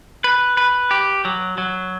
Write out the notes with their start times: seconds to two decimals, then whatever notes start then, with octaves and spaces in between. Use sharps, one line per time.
0.24 B4
0.57 B4
0.91 G4
1.25 F#3
1.58 F#3